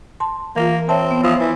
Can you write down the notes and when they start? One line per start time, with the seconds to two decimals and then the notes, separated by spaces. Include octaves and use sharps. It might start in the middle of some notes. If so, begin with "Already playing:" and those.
0.20 A5 C6
0.56 E3 A#3 F4
0.89 C4 C#5 E5 A5
1.11 B3
1.23 F3 E5 D#6 E6
1.40 E3